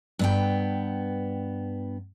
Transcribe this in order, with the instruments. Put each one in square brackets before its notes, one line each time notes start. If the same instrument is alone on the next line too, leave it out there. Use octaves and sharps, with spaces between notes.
[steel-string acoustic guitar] G2 B3 G5